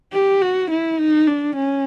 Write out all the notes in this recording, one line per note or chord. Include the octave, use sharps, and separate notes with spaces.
G4
F#4
E4
D#4
D4
C#4